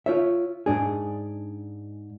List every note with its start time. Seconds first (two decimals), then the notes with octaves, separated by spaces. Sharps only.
0.06 F4 C#5 E5
0.66 G#2 D4 G#4